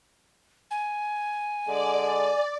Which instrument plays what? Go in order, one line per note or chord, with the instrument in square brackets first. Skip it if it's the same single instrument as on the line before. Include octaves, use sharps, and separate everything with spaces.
[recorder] G#5
[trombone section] D3 G#3 [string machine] D5